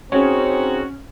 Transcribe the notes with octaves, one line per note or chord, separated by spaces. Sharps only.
C4 C#4 D#4 F#4 G#4 C#5